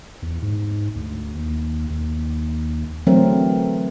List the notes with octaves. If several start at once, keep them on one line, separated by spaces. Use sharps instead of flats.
E2
G#2
D2
D#2
D#2
D3 E3 F#3 A3 C4 A#4